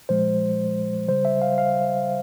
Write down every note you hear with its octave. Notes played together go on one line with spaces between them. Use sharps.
A#2 F3 G#3 C5
C#3 G3 C5
E5
F5
F5